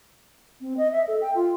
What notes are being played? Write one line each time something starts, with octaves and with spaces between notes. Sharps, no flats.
C4
D#5
E5
A4
G5
F4